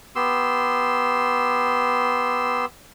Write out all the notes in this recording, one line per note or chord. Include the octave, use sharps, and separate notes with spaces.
B3 G4 C6 E6